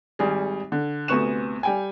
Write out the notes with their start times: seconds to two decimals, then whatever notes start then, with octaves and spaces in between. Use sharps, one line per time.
0.19 G#1 G3 G#4
0.72 D3
1.08 D2 C3 B3 C#6 F#6 E7
1.63 G3 G5 G#5